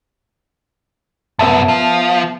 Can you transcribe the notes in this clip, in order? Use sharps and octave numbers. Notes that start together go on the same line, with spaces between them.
C2 F#2 B3 E5 A5
F3